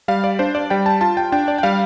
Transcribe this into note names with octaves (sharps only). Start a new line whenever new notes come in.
G3 F5
D5
D4 C5
D5
G3 G5
A5
F4 A5
G5
D4 G5
D5
G5
G3 F5